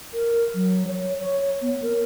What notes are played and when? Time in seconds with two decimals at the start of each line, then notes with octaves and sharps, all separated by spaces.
0.14 A#4
0.55 F#3
0.88 C#5
1.20 C#5
1.62 B3
1.82 A#4